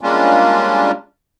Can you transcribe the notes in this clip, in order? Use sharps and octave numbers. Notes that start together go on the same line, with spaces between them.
G3 G#3 A#3 C#4 D4 F4